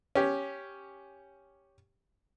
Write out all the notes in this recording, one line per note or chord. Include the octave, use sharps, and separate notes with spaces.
C#4 G4